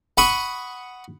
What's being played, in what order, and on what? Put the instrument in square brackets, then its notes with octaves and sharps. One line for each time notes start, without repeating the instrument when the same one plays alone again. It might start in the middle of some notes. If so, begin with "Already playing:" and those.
[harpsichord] F#5 B5 C#6 D#6